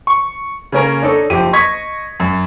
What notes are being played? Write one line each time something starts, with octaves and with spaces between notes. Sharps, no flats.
C#6
C#3 A#3 C#4 A#4
D4 D#4 A4 C#5
F#1 F3 G4 D#7
D#5 C#6 G#6 B6
F#2